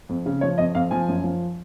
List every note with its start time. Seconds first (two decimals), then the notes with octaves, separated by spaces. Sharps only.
0.09 F2
0.26 C#3
0.41 F3 C#5
0.58 F2 D#5
0.75 F2 F5
0.91 F3 G#5
1.08 F#2
1.24 F3